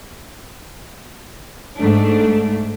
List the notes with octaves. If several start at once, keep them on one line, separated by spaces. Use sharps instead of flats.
G#2 A3 D4